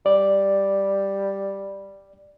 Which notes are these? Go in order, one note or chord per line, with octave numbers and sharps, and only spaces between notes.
G3 D5